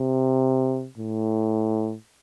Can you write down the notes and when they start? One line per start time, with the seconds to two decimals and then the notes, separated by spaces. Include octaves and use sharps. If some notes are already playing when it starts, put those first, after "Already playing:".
Already playing: C3
0.98 A2